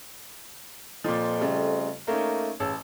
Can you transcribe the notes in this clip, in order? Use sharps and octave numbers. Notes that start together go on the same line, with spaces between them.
F2 A#2 F3
C#3 G3 A3
A3 A#3 C#4 D#4
A1 C#3 A5 E6